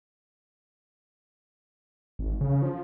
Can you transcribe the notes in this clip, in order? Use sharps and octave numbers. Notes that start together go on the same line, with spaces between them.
G#1
C#3
F3